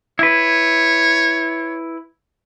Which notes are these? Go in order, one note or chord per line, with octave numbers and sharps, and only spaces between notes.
E4 B4 C#5